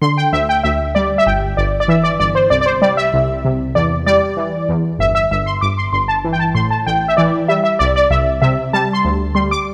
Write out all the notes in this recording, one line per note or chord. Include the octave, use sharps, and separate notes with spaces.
D3 C6
G5
D2 E5
G5
D2 E5
G3 D5
E5
G1 G5
G1 D5
D5
E3 E5
D5
G1 D5
C5
C2 D5
D5
C5
G3 D5
E5
C2
C3
E2 D5
G3 D5
E3
E2
G1 E5
E5
G1 E5
C6
G1 D6
C6
G1 C6
A5
E3
G5
A5
A2 C6
A5
A1 G5
E5
E3 D5
G3 E5
E5
C2 D5
D5
C2 E5
C3 E5
G3 A5
C6
D2
G3 C6
D6